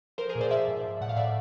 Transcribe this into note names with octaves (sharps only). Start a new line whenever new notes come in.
F3 A#4 C5
G#4 A#4
A#2
C5 D5
F3 D5 E5
G#2
F3
A2 F#5
F5
A2 D5 E5